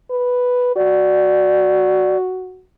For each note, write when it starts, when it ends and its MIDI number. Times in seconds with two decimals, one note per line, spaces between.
0.11 0.71 71
0.76 2.63 66
0.76 2.17 74